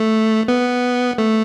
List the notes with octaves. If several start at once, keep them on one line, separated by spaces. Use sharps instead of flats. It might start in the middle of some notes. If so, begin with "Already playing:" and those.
Already playing: A3
B3
A3